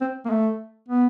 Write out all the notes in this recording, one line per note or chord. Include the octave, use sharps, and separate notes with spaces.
C4
A#3
A3
B3